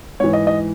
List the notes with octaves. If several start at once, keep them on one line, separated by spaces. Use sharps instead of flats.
G#2 E3 C#5
D#5
D#5